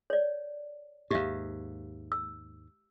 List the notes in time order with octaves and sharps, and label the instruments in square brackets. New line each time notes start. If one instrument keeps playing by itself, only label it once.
[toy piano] C#5 D5
[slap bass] D#2 G#2 [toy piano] G4 E5 F5
[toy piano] E6